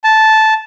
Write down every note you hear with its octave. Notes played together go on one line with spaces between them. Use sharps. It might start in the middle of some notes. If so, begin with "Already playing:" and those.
A5